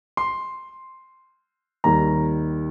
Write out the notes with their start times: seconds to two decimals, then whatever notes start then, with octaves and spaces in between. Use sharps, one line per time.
0.17 C6
1.84 D#2 D#3 G3 A#5